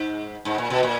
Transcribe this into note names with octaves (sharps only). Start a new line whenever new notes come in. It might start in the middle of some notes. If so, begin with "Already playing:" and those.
Already playing: G#2
G#2
A#2
B2
A#2